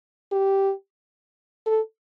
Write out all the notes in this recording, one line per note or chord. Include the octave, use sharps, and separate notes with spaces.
G4
A4